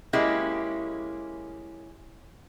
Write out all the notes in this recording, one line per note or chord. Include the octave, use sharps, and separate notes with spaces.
G#3 A#3 C#4 E4 G4